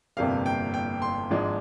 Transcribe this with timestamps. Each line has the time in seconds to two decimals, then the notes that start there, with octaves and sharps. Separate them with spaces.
0.17 G1 F2 C3 G3 A#3 F5
0.46 G5
0.74 G5
1.02 C6
1.30 G#1 G#2 F3 G#3 D4